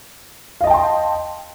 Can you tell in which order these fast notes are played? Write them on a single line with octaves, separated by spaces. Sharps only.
F5 D#5 A5 G5 C6